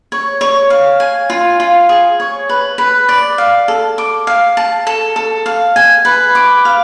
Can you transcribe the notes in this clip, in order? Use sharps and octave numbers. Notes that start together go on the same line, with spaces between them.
C#5
C#5
F5
G#5
F4
F4
G#4
C#5
B4
B4
D5
F5
A4
D6
F5
A5
A4
A4
F5
G#5
B4
D6
F5